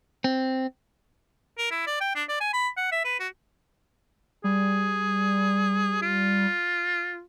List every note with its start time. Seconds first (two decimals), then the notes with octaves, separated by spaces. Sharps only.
0.24 C4
1.58 A#4
1.71 E4
1.87 D5
2.01 G5
2.15 D4
2.29 D5
2.41 G#5
2.53 B5
2.77 F#5
2.92 E5
3.05 B4
3.20 F#4
4.44 G3 G#4
6.02 F4